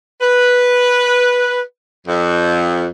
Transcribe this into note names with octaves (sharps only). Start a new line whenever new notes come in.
B4
F2